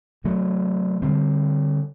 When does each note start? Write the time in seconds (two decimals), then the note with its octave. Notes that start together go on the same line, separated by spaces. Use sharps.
0.24 C3 F#3 A3
1.02 D3 G3 C4